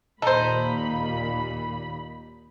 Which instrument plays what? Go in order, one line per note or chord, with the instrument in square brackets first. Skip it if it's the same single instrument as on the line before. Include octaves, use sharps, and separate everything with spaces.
[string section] D#2 A#2 B5 [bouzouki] D#4 [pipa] A4 C5